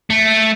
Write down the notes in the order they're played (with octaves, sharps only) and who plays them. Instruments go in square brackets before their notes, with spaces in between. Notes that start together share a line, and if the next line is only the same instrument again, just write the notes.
[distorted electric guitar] A3